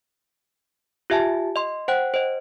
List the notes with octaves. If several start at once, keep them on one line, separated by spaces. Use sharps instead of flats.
F4 G4 E5 G#5 A5
D#5 C6
C5 F#5 G5 F#6
C5 D#5